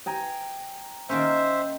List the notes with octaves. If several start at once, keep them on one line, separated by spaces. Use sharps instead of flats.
G5 G#5 A#5
D#3 A#3 C#4 C5 E5